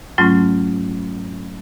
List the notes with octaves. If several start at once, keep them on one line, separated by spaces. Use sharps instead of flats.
G#2 F#3 A3 C#4 F4